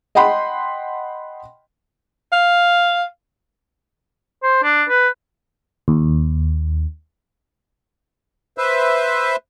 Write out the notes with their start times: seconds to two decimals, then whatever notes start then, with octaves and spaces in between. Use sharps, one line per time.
0.15 D#5 F#5 G5 B5 C6
2.32 F5
4.43 C5
4.63 D4
4.89 B4
5.88 D#2
8.58 B4 C5 E5